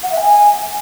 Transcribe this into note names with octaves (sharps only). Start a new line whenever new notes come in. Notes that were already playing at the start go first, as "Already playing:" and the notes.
F#5
E5
G#5